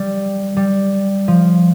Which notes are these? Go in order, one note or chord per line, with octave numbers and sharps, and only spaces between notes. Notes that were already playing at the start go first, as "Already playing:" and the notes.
Already playing: G3
G3
F3